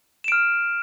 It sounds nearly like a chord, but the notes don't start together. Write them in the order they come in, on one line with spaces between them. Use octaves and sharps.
E7 D7 F6